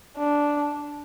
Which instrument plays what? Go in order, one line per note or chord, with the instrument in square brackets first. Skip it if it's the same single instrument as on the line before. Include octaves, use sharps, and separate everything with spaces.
[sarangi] D4